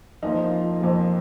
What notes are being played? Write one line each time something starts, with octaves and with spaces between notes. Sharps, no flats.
F2 F3 A#3 D#4
F4
F2 F3 A#3